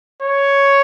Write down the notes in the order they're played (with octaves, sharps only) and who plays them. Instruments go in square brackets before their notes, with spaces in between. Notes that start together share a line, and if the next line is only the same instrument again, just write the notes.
[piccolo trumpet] C#5